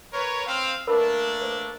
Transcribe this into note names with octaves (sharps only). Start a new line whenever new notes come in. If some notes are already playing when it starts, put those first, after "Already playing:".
A#4 B4 C#5
C4 F5
A3 A#3 D4 A#4 B4 B5
B4 C5